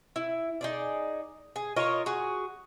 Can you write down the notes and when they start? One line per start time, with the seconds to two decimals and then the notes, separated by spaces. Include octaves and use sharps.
0.16 E4
0.61 D#4 G#4 D5
1.56 G#4
1.76 F4 A#4 C#5 D#5
2.06 F#4 G#4